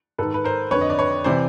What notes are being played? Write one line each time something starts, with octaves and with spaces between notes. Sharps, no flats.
G#2 D#3 A4 B4
B4
A#4 C5
F2 D3 B4 C#5
D#5
D5
B4 C#5
C3 E3 C5 D5